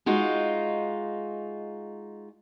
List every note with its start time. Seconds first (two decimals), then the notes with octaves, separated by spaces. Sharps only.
0.06 G#3 D#4 F4 F#4